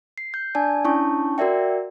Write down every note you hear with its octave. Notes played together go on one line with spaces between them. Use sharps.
C7
G6
D4 D5 G#5 A5
C#4 D4 E4 A5 C#6
F#4 A#4 D5 E5 G5